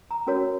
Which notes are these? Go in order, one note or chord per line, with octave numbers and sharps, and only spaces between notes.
A#5
C#4 F#4 A#4 C#5